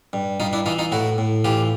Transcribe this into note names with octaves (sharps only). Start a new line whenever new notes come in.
G2
G2 D#4 F4
D4 E4
E3 D#4 F4
D#4 F4
A2 E4 F#4
A2
E3 F4 G4